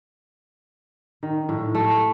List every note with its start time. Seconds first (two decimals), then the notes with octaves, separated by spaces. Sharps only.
1.23 D#3
1.49 A2
1.75 A3